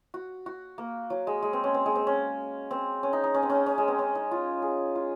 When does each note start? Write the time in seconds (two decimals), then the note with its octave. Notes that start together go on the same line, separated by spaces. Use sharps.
0.14 F#4
0.46 F#4
0.78 A#3
1.10 F#3
1.27 G#3
1.42 G#3
1.53 C4
1.64 C#4
1.74 C4
1.86 G#3
1.95 C4
2.07 C#4
2.71 C4
3.03 C#4
3.13 D#4
3.24 D#4
3.34 C#4
3.43 C4
3.50 C#4
3.66 C#4
3.78 G#3
3.88 C4
3.99 C#4
4.15 D#4
4.31 F4
4.62 G#4
4.95 F4